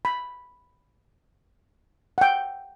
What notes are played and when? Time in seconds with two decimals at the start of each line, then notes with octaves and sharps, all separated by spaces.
0.05 B5
2.18 F#5 G5